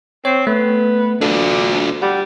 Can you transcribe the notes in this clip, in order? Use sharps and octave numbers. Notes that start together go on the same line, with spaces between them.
C4 C#5
A3 B3
D2 D4 F4 A4
G3 F#5